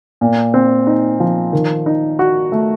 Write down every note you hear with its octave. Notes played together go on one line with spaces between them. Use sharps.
A#2
C4
D#4
F3
D#3
D#4
F#4
A3